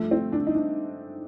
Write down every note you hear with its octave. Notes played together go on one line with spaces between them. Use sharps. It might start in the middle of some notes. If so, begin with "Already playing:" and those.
Already playing: G2 F3 A3
C4
D4
D#4
D4